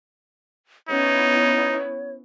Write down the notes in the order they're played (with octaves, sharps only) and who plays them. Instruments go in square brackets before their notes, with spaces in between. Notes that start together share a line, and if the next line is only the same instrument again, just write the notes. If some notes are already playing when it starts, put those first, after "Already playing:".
[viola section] B3 C#4 E4 [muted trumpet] D#4 [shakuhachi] C#5